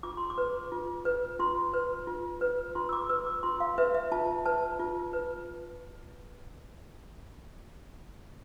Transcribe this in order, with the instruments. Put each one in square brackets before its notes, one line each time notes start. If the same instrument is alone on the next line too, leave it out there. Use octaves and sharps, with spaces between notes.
[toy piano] F4 D6
C6
D6
B4
F4
B4
F4 C6
B4
F4
B4
F4 C6
E6
D6
B4 E6
D6
F4 C6
F5
B4 E5
E5
F4 A5
B4 A5
F4
B4